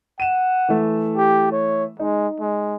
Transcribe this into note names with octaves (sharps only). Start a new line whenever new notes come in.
F#5 D#7 E7
E3 A3
G4
C#5
G#3 D#4
G#3